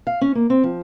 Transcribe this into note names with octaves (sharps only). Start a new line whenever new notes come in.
F5
C#4
A#3
C4
F3